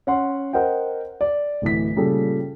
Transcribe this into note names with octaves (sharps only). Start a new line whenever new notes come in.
C#4 F#5 C6
A#4 C5 D#5 F#5 G5
D5
D1 E3 B6
A#2 C#3 G3 G#4 A4